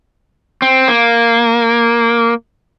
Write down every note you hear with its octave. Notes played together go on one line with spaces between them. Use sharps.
C4
A#3